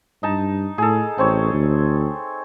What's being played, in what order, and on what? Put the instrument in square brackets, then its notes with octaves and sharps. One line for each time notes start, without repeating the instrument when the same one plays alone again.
[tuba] G2 [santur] D#4 A5
[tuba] A2 [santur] G#4 A4
[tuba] A1 [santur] C4 C5 C#5
[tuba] D2